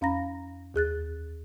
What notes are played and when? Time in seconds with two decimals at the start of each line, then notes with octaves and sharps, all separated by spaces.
0.01 F2 C#4 F5 A#5 B5 A#6
0.74 D#2 G#4 F#6 A6